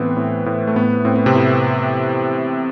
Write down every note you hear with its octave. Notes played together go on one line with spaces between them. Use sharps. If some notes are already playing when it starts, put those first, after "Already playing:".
Already playing: A2 E3 B3 C4
A2
A2
A3
A2 B3
A2 C4
B3
C3 C4
A2